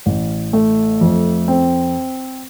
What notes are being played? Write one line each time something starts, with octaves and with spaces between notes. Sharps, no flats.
A1
A3
F2
C4